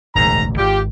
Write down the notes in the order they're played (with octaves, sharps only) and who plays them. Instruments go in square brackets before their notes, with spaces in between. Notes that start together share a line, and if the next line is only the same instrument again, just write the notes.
[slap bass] E1 A1 D2 [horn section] G#2 D#3 A#5
[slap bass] G#1 [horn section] F4 G4